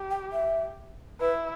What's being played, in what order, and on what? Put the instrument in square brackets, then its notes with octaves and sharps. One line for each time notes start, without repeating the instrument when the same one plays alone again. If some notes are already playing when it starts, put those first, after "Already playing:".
Already playing: [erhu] G4
[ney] G5
E5
[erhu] E4 [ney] B4